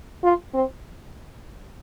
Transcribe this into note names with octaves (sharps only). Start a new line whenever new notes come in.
F4
C4